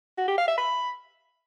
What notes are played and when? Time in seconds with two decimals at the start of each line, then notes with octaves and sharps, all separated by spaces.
0.18 F#4
0.28 G4
0.38 F5
0.48 E5
0.58 B5